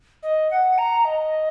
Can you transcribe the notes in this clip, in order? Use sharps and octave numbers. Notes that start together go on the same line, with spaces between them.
D#5
F#5
A#5
D#5